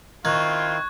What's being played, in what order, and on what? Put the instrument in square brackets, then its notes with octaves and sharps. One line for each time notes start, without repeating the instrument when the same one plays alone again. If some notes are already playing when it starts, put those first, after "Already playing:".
[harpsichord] D#3 [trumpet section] C4 E4 F4 [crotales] C#6 F#6 G#6